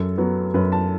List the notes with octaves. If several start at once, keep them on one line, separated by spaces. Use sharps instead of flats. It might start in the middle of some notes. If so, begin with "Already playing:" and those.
Already playing: F#2 A4
F#3 B3
F#2 B4
A5